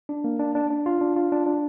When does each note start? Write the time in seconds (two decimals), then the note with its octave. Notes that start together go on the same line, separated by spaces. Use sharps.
0.09 D4
0.24 A#3
0.39 D4
0.55 D4
0.70 D4
0.86 F4
1.01 D4
1.16 F4
1.32 D4
1.46 D4